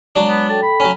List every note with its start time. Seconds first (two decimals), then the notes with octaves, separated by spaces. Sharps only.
0.16 F#3 G#3 D4
0.28 B3
0.49 A4 G5 A5
0.62 B5
0.80 F#3 C#4